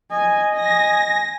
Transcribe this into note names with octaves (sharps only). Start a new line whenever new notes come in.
D#5 G#5
G#5 A#6